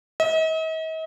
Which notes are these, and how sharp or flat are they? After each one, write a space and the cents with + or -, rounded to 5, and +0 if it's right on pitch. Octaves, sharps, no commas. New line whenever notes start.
D#5 +45